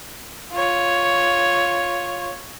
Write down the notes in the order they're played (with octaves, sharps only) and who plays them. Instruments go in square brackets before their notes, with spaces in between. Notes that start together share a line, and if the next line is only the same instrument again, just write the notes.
[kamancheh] F4 C#5